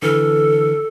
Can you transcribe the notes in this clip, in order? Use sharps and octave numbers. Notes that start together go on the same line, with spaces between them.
D3 E3 A4 F6